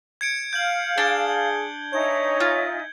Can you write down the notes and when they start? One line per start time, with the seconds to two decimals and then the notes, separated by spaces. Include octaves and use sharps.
0.21 G#6 C#7 D7
0.53 F5 G6 G#6 F#7
0.98 D4 G#4 G#6 G7
1.93 D#4 C#5 E5 G#5 G#6
2.40 F4